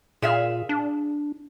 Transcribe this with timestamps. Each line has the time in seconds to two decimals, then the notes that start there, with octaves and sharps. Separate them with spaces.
0.22 A#2 G#4 E5 F5
0.69 D4